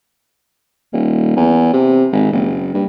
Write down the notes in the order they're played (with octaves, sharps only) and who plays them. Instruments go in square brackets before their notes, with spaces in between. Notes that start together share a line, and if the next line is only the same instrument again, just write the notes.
[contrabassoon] D#1
E2
C3
G#1
F#1
G2